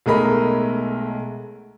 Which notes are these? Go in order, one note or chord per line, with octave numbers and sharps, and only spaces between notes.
B1 G#3 A3 A#4 D#5 B5